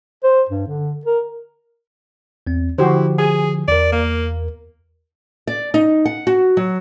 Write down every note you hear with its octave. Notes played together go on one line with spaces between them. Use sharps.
C5
G2
D3
A#4
E2 C4
D3 F3 E4 F#4 G4 C5
G#4 G#5
E2 A#4 D5
A#3
D5
D#4
F#5
F#4
F#3